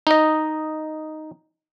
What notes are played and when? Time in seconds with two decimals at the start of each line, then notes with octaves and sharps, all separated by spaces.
0.07 D#4 D#5